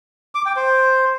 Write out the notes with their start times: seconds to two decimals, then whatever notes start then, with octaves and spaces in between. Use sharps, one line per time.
0.35 D6
0.46 G5
0.56 C5